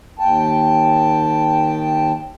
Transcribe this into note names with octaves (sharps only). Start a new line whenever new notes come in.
D#2 G5 A5